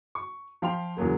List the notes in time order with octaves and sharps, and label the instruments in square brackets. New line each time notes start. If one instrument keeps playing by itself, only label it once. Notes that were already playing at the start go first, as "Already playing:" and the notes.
[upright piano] C#6
F3 F5 G5 C6 F7
E2 C#3 F#3 A#3